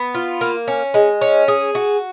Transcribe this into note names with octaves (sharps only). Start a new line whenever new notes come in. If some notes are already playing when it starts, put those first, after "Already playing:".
Already playing: B3
F4
A#3
C#4
G#3
C#4
G#4
F#4